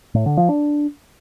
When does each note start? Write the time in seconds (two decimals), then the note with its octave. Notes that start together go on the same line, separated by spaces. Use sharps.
0.15 A2
0.26 D3
0.37 F3
0.49 D4